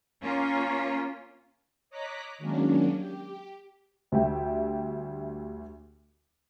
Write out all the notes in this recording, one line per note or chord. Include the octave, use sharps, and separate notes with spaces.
A#3 C#4 F4
C#5 D#5 A#5 D6 F#6 B6
D#3 F#3 G#3 A#3 C#4 D4
G4
D2 G3 E5 G5